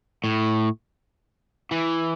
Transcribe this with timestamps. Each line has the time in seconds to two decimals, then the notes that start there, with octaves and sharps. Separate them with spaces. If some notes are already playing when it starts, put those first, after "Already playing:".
0.24 A2
1.71 E3